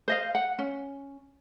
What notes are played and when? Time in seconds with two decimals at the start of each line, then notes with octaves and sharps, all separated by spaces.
0.08 C5 D#5 F5
0.35 F#5
0.59 C#4